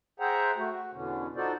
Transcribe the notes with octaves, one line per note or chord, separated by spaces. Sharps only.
G#4 C5 E5 F#5 G5 A#5
A3 F#4
F#4
E2 B2 D3 C#4
D#4 F4 F#4 A4 C5 D5